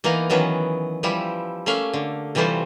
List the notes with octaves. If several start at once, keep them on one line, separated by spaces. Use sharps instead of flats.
E3 A#3 B3 D#4 F5
D#3 E3 F#3 B3 C#4
E3 F3 G3 E4 G4
A3 A#3 C#4 E5 F5
D3
C3 E3 G3 A3 F4 C5